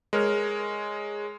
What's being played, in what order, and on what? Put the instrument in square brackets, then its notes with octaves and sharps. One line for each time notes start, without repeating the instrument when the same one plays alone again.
[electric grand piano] G#3 A#4 C#5 F6